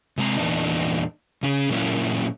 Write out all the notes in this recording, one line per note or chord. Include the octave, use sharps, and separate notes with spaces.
C3 G#3 C4 A#5
E2 A#2 D4 D#4
C#3 C#4 G#4
A#2 F#3 A#3 C#4 E4